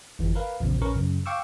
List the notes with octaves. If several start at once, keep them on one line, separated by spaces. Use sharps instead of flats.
G1 F2 E3
A#4 B4 F5
A#1 E2 C#3 F3
A#1 C#4 A#4 B4 C#6
F#2 C#3
F5 G5 C#6 D6 E6